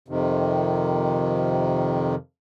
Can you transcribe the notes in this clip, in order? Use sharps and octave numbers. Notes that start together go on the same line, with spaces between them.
F2 C3 D#3